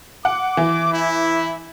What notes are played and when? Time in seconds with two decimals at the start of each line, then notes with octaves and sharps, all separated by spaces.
0.25 F#5 D6
0.57 E3
0.93 E4